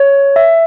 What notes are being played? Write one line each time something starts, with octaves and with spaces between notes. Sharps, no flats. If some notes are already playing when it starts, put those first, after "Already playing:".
Already playing: C#5
E5